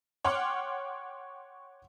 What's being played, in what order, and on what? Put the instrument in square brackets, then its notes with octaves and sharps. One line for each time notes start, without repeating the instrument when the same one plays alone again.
[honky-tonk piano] C#5 F#5 G5 C6 D6 F6